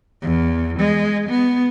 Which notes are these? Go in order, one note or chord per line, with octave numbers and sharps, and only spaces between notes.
E2
G#3
B3